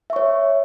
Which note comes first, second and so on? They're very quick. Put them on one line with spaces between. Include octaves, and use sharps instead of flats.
E5 C#6 C#5